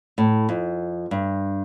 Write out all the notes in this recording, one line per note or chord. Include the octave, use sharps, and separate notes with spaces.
A2
F2
G2